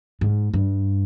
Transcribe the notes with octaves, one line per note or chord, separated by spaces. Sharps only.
G#2
G2